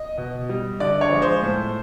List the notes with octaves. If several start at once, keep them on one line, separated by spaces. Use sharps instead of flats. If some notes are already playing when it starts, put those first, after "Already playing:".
Already playing: D#5
B2
G3
D3 D5
C#5
F3 G#3
C5
A2